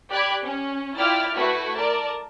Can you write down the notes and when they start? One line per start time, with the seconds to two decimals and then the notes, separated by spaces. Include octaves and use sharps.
0.11 G4 D5 B5 F#6 G#6
0.46 C#4
0.97 E4 F4 D5 G5 F6 A6
1.36 A3 E4 F#4 B4
1.76 A#4 D5 A5